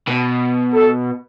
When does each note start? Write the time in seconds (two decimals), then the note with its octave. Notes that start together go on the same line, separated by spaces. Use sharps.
0.08 B2
0.73 A4